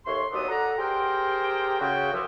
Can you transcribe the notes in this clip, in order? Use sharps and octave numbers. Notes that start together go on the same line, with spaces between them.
D#2 A3 C#5 C6
D#2 F#3 B3 C4 D4 D#6
F#4 A4 D5 F#5 A#5
G4 G#4 A#4 C5 G5
C#3 F#4 G5
F#2 E3 F3